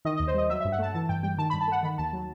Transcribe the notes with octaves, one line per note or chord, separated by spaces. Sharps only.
D#3 D#5
D#5
D#2
C5
G3 D#5
F#3 E5
E5
G2
F#5
A3 A5
E3 A5
G2 G5
G3 G5
D#3 A5
B5
G2
A5
A3 F#5
D#3 B5
D#2 A5
F#3